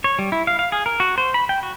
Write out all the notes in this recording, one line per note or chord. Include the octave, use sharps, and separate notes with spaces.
C#5
G3
E4
F5
F5
G#4
A#4
F#4
C5
B5
G5
F#4